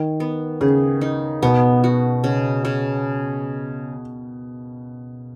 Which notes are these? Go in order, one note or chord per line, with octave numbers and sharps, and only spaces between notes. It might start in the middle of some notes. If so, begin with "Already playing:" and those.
Already playing: D#3
B3
C#3 G#4
D#4
B2 B3
F#4
C#3
C#3